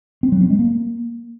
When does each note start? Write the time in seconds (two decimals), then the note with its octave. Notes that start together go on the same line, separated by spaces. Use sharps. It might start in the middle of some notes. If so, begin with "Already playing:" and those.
0.23 C4
0.32 F#3
0.41 C4
0.50 G#3
0.59 A#3